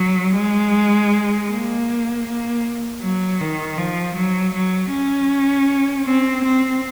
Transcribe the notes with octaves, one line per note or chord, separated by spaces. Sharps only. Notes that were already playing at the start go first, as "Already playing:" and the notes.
Already playing: F#3
G#3
A#3
A#3
F#3
D#3
F3
F#3
F#3
C#4
C4
C4